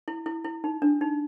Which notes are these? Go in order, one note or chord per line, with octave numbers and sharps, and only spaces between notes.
E4
E4
E4
D#4
D4
D#4